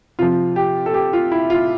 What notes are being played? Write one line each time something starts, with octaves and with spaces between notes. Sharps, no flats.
C3 F3 F4
G4
A4
G4
F4
E4
F4